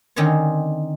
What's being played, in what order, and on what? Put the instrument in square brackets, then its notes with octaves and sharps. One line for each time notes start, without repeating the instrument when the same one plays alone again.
[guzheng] D3 D#3 C4 C#4 C#5